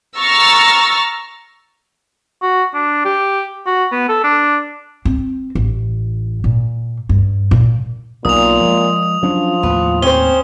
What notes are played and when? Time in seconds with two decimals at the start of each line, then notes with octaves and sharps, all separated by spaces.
0.19 A#5 C#6 E6 F6 A6 A#6
2.42 F#4
2.74 D4
3.05 G4
3.66 F#4
3.92 B3
4.09 A4
4.24 D4
5.05 C4
5.55 A1
6.44 A#2
7.09 G2
7.51 A#2
8.25 B1 A#2 D#6 F7
8.61 F3 G#3
9.23 F3 F#3 C#4 D4
9.63 D#2 A2 B3
10.02 C4 C#4 C5 G7